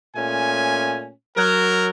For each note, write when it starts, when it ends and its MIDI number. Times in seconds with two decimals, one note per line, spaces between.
0.15 1.09 46
0.15 1.09 57
0.15 1.09 61
0.15 1.09 80
1.36 1.89 54
1.36 1.89 70